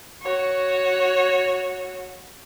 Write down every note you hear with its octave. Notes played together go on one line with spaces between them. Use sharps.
F#4 C#5